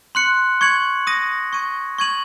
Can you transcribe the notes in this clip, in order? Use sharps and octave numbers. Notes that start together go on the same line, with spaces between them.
C6 F#6 C#7
C#6 G#6 C#7 F#7
D#6 A#6 D#7
C#6 G#6 D#7
C#6 G#6 D#7 F#7